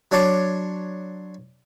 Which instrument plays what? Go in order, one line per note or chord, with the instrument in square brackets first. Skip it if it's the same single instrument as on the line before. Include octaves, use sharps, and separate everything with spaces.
[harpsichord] F#3 D4 C#5 A5 C6 D6